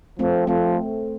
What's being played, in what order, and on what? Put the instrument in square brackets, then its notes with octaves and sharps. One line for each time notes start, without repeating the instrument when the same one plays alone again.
[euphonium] F3 [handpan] A3 C4
[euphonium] F3 [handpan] A3 C4